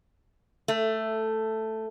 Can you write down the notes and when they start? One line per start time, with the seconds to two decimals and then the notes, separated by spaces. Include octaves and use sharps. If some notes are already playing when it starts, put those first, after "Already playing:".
0.68 A3